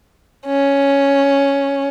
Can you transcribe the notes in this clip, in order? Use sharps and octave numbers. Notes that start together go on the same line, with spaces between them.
C#4